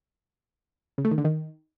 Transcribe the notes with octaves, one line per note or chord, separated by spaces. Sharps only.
C#3
A3
D#3
D3
D#3